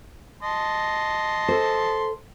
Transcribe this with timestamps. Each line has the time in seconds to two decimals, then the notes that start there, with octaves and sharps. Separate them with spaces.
0.43 D#5 A5 C6
1.48 A4 C5